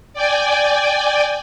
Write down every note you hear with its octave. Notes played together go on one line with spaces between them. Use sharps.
D5 G5 G#5